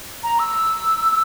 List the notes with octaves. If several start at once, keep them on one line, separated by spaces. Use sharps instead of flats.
A#5
E6